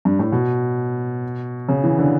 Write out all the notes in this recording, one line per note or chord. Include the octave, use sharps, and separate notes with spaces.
G2
A2
B2
C#3
E3
D3